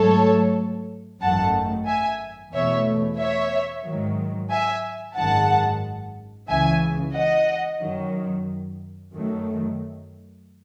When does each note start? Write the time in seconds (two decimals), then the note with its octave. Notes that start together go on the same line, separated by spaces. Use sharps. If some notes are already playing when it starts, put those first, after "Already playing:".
Already playing: G#2 F#3 A3 A4 C#5
1.21 G#1 F#2 D#3 A3 F#5 A5
1.87 E5 G#5
2.53 E2 B2 A3 C#5 E5
3.19 C#5 E5
3.85 G#2 D#3 F#3
4.51 E5 G#5
5.17 G#1 F#2 D#3 G#3 F#5 A5
6.48 C#2 C#3 E3 E5 G#5
7.15 D#5 F#5
7.81 F#2 D#3 F#3
9.12 F#2 D#3 F#3 A3